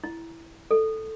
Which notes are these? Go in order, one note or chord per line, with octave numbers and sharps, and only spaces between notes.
E4
A4